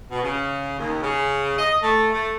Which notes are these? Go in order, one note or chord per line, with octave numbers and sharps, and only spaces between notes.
B2
C#3
D#2
C#3
D#5
A3
A3